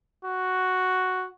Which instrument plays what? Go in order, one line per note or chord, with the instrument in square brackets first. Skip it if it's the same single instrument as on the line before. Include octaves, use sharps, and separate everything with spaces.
[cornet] F#4